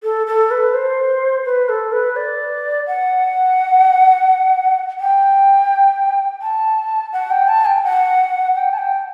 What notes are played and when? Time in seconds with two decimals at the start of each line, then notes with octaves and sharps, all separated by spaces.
0.03 A4
0.27 A4
0.51 B4
0.74 C5
1.45 B4
1.69 A4
1.92 B4
2.16 D5
2.87 F#5
5.00 G5
6.42 A5
7.13 F#5
7.31 G5
7.48 A5
7.66 G5
7.84 F#5
8.55 G5
8.74 A5
8.78 G5